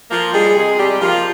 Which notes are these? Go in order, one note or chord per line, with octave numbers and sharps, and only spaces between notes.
F3 A#3 F4
G3 G#3 G#4
C3 G#3 G#4
C3 G3 G4
F3 A#3 F4